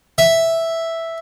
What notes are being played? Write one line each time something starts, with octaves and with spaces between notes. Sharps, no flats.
E5